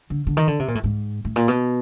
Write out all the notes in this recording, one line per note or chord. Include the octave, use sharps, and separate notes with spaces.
D3
D3
D#3
D3
C3
A#2
A2
G#2
A2
A#2
B2